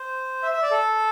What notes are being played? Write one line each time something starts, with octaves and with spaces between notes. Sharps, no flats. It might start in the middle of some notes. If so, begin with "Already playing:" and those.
Already playing: C5
E5
E5
D5
A4